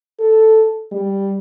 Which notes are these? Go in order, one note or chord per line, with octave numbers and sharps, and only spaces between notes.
A4
G3